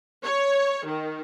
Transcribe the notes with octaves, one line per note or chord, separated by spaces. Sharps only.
C#5
D#3